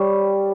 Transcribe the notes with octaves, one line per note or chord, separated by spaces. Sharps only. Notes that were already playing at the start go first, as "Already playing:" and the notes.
Already playing: G3 C#5